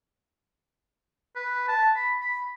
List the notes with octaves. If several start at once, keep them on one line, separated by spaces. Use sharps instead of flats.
B4
A5
B5
B5